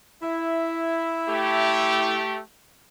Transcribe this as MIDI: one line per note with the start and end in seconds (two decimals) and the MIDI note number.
0.22 2.22 64
0.22 2.22 76
1.29 2.41 57
1.29 2.41 67